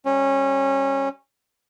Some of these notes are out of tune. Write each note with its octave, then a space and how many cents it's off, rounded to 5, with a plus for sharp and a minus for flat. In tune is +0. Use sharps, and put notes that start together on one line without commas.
G3 +0 C#4 -20